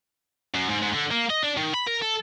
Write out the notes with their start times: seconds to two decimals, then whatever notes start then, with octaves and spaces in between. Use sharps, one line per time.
0.54 F#2
0.70 G#2
0.83 G#2
0.94 D3
1.11 A#3
1.30 D#5
1.43 D4
1.57 D#3
1.74 B5
1.87 A#4
2.02 A4